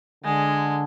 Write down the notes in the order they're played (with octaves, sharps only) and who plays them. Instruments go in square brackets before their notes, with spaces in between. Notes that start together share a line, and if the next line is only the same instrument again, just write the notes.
[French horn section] D3 [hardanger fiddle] G#3